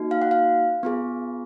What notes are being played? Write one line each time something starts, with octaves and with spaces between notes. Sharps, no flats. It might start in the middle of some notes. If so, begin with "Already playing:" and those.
Already playing: A#3 D#4 F#4
F5
F#5
F5
B3 F4 G#4